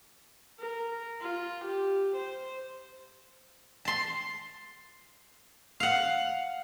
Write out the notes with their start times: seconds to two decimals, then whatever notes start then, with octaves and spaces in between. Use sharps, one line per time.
0.59 A#4
1.21 F4
1.64 G4
2.16 C5
3.85 A5 C6
5.80 F5 F#5